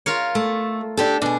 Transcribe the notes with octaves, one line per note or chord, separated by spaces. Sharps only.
F4 A#4 C#5
A3
D4 G4 A4
B2 D4 G#4